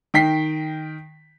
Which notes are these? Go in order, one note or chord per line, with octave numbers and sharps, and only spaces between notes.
D#3 G5 B6 C7